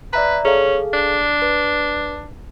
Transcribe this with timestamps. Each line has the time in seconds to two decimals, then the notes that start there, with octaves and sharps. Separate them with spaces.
0.13 B4 D5 E5 A#5
0.45 C#4 G#4 A4 F5
0.94 D4
1.42 B4